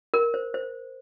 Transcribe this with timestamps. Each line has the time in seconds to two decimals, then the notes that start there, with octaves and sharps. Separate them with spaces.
0.14 A#4
0.34 C5
0.54 C5